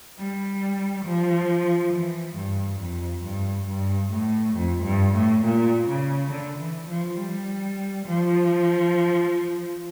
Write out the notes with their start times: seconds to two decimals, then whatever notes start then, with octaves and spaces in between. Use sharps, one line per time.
0.18 G3
1.06 F3
1.93 E3
2.37 G2
2.80 F2
3.24 G2
3.68 G2
4.12 A2
4.56 F2
4.84 G2
5.14 A2
5.44 A#2
5.88 C#3
6.30 D3
6.60 E3
6.89 F3
7.18 G3
8.05 F3